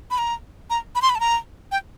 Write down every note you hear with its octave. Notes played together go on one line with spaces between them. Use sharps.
B5
A#5
A#5
B5
C6
B5
A5
A#5
G5